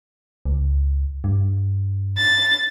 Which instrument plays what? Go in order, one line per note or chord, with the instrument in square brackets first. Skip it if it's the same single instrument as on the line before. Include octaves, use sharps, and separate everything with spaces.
[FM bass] C#2
G2
[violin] A6